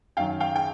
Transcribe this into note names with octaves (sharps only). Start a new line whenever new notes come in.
F#2 D#3 F#3 F5 G5
F5 G5
G5